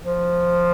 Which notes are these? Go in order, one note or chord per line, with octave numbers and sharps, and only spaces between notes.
F3